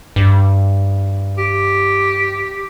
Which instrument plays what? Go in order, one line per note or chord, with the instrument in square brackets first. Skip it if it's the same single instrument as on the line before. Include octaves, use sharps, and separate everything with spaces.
[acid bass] G2
[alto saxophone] G4